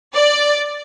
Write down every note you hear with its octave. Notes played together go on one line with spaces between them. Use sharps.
D5